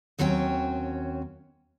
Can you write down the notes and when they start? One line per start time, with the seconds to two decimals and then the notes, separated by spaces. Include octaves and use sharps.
0.19 D#2 F#3 C4 C#4 G5